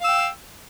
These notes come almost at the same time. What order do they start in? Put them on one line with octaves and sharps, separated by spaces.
F5 E6 G5